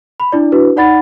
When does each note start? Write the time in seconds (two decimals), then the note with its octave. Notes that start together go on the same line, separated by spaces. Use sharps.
0.20 B5
0.32 D4 E4 D5
0.52 D4 E4 F#4 B4
0.76 D#4 D5 F#5 B5 A6